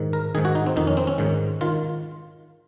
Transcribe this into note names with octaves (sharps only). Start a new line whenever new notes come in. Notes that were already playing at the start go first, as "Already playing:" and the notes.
Already playing: G#2 D#3
A#4
G#2 D#3 G#4
F#4
D#4
C4
F2 D#3 D#4
C#4
C4
C#4
G#2 D#3
D#3 F4